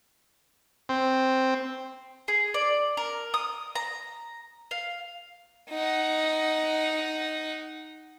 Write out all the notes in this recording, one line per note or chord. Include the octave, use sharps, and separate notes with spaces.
C4
G#4
D5
A#4
D#6
A#5
F5
D#4 F#5